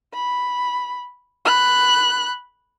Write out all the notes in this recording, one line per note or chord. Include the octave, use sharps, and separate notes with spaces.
B5
B5 F#6